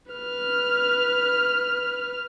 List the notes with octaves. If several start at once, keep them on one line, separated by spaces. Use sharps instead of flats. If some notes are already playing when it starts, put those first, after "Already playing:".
B4 F6